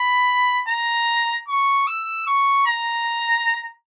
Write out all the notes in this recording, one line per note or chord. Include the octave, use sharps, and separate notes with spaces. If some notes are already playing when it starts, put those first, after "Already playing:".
Already playing: B5
A#5
C#6
E6
C#6
A#5